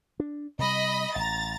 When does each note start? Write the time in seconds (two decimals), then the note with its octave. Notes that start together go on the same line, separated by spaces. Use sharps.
0.20 D4
0.59 C3 G3 D#5 B5
1.16 A1 A#5 A6